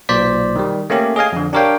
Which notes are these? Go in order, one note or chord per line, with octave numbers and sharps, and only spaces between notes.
B1 A#2 C5 D5 B6
D#3 G3
A3 A#3 C#4 G4
G#4 D#5 F5 G#5
F2 D3
D4 G4 A#4 C#5 F5 G5